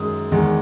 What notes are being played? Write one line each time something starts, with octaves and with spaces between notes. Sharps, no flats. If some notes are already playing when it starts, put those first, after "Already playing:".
Already playing: F#2 D#3 G#3 D#6
E2 D#3 G#3